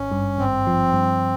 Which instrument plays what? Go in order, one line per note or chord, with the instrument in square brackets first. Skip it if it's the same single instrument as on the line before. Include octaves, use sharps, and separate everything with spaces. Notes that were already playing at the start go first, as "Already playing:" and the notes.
Already playing: [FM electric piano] G#1 [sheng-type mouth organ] C#4
[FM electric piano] G2
[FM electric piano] G#1 [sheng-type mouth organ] C4
[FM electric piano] F3
G2